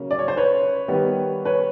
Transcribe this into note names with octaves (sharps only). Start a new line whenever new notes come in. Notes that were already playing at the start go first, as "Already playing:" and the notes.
Already playing: C#3 F#3 A#3 C#4
D5
C#5
C5
B4 C#5
D#3 G3 B3
B4 C#5